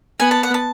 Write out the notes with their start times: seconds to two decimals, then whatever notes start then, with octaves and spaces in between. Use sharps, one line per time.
0.19 B3 G#5
0.31 A5
0.43 F#5
0.54 A5